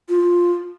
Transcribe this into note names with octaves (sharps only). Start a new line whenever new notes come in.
F4